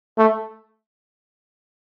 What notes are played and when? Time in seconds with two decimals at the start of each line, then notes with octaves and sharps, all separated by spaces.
0.18 A3